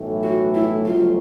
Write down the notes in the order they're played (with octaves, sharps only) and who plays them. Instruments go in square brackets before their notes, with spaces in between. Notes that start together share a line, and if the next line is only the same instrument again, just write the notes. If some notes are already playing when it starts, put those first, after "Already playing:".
Already playing: [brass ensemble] B1 A2 E3 A3
[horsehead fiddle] F#4
E4
[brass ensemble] G1 F2 C#3 F#3 A3 [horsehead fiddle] F4